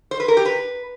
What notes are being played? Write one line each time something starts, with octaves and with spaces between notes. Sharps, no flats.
C5
B4
A#4
G4
B4